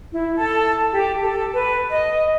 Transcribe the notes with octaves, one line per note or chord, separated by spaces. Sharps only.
E4
A4
G4
A4
B4
D#5